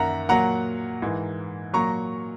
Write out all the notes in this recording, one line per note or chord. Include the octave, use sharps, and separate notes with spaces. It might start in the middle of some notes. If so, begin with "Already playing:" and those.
Already playing: F#2 D#3 A#3 E5 F#5 A#5
A#2 F#3 A#3 F#5 A#5
G#2 E3 A#3
A#2 F#3 A#3 A#5 C#6